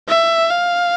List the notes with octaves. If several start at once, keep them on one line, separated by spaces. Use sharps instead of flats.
E5
F5